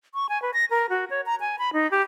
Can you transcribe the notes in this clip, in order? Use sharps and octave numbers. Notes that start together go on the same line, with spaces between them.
C#6
G#5
B4
A#6
A#4
F#4
C#5
A#5
G#5
B5
D#4
G4